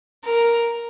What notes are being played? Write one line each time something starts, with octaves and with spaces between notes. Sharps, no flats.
A#4